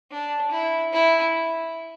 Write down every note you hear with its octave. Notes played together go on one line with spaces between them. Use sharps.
D4
E4
E4